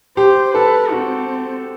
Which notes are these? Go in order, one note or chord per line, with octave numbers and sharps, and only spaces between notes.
G4 C5
A4 B4
C4 F#4